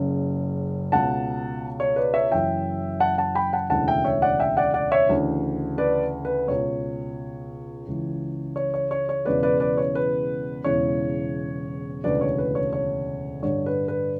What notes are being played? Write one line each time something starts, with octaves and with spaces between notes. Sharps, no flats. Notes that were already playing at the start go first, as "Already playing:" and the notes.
Already playing: F#1 F#2 C#3
C#2 B2 F#5 A5
C#5
B4 D5
C#5 E5
F#1 F#2 E3 E5 G5
F#5 A5
F#5 A5
G5 B5
F#5 A5
E1 D2 C#3 E3 F#5 A5
E5 G5
C#5 E5
D5 F#5
E5 G5
D5 F#5
D5 F#5
C#5 E5
D2 C#3 E3
B4 D5
B4
C#2 B2 C#5
C#2 C#3 E3
C#5
C#5
C#5
C#5
E1 E2 C#3 E3 B4 D5
B4 D5
B4 D5
C#5
B4
E1 E2 C#3 E3 C#5
E1 D2 C#3 E3 B4 D5
C#5
B4
C#5
C#5
A1 G2 D3 C#5
B4
B4